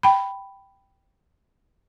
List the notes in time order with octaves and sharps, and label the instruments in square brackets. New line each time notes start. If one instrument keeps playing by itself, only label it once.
[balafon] G5 B5